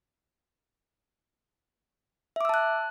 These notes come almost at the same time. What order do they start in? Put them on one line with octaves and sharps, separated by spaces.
E5 D6 E6 A5 F#6